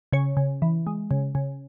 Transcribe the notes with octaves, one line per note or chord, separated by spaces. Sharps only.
C#3 C#5
C#3
E3
G#3
C#3
C#3